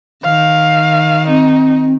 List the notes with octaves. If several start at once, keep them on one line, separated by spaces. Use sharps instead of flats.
D#3 F5
C4 D#4